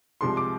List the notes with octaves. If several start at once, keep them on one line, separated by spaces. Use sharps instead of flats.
C2 C3 F3 G#3 C6
D6